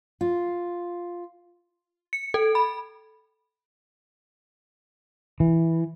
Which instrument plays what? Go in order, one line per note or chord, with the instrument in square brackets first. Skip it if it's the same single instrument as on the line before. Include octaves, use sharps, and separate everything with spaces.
[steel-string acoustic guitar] F4
[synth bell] C#7
A4
B5
[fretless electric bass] E3